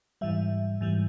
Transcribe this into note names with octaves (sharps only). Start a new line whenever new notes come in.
G#2 E3 G3 E5
G#2 E3 G3